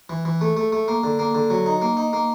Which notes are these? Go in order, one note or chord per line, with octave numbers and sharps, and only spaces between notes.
E3
E3
A3
A3
A3
A#3
D3
A#3
D3
F#3
D#4
A#3
D#4
A#3